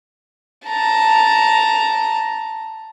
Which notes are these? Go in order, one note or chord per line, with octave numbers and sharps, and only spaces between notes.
A5 A#5